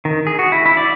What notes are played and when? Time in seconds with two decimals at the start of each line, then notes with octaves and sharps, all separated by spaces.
0.05 D#3
0.27 G#4
0.39 F#4
0.52 E4
0.66 E4
0.77 D5